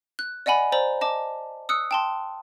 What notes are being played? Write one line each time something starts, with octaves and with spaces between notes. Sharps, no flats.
F#6
D5 D#5 F#5 G#5 B5
C5 D5 A#5 F#7
D#5 A5 D6
D#6 E6 F#6 C#7
G5 A5 C6